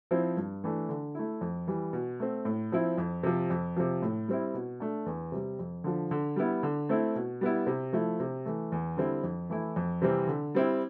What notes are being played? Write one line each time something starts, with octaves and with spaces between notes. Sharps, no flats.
F3 C4 E4
G2
E3 A3 D4
D3
A3 E4
F2
E3 G3
B2
A3 C4
A2
F3 C4 E4
F2
C3 F3
F2
C3 F3
A2
G3 C4 E4
B2
A3 D4
E2
C3 G3
F2
D3 F3
D3
G3 B3 E4
D3
A3 C4 E4
B2
G3 B3 E4
C3
F3 A3 E4
C3
E3 A3
E2
D3 G3 C4 E4
F2
E3 A3 E4
F2
C3 E3 G3 C4
D3
G3 C4 E4